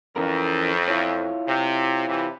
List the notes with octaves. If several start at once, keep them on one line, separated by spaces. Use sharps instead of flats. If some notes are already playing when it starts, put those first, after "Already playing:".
F2 E3 C#4 A#4
E4 F4 C#5
C3
C3 E3